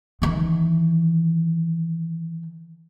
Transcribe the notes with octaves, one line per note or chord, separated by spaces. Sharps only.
D#3 E3